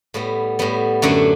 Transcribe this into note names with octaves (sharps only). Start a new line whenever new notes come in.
A2 G3 B3
A2 G3 B3
F#2 D3 A3 D4